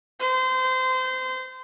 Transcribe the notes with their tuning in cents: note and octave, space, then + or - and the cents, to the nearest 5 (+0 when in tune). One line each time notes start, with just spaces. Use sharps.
C5 -25